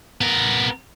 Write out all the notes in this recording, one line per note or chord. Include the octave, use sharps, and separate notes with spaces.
B3 A#4